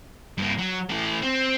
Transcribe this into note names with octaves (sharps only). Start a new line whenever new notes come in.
G2 A#3
F#3
A2 E3
C4